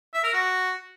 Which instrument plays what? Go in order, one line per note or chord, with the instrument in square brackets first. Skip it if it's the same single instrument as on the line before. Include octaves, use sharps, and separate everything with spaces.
[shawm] E5
A#4
F#4